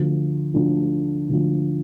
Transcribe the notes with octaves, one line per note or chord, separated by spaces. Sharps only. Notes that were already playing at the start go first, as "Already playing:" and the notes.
Already playing: D2 D3 F3
D2 D3 F3
D2 D3 F3